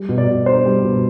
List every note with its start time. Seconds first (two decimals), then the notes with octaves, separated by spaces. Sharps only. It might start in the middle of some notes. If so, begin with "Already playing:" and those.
Already playing: G3
0.09 B2
0.18 D5
0.27 B2
0.46 D4 C5
0.65 G3
0.84 B2